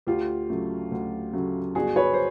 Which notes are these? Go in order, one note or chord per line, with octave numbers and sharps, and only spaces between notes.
D2 F4 G4
C#3 F#3 A3
D2
C#3 F#3 A3
G1 F#4 G#4
B4 C#5
C5